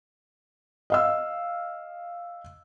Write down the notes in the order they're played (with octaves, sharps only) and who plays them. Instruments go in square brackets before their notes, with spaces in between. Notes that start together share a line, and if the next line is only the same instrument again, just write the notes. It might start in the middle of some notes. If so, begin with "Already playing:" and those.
[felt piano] D#5 F5 E6